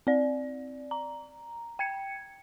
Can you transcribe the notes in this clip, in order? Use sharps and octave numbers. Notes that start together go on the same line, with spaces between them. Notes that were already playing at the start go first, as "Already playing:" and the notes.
C4 D5
A#5
G5 G#6 C#7